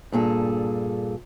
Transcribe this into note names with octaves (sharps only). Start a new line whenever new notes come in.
G2 A#2 G#4 A4